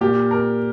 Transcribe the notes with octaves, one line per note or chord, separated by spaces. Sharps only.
A#2 A#3 G4
A#4